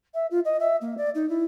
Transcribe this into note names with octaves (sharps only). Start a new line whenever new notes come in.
E5
F4
D#5
E5
A#3
D5
D#4
E4